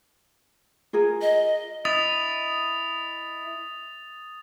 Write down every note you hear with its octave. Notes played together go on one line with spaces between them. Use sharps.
F4 G#4 A#4
D#5
E4 D#5 D#6 A6 F7